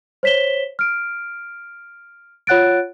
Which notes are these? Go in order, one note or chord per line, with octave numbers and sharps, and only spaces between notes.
C5 C#5 B6 E7 G7
F6 D7
F4 C#5 F#5 F#6 A6 D7